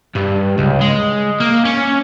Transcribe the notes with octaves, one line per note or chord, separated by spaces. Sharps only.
G2
C#2
G#3
A#3
C#4